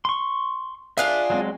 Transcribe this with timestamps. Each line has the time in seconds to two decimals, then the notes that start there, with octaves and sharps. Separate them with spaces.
0.05 C6 C#6
0.98 D4 F4 G#4 E5 F#6
1.30 F#3 G#3 C4